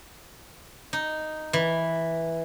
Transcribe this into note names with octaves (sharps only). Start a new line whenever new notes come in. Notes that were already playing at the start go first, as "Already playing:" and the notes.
D#4
E3